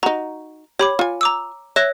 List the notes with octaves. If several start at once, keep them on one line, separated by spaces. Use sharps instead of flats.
D#4 F#4 A#5
G4 C#5 B5 D6
F4 G#5
A#5 D6 E6
C#5 E5 F#6 A#6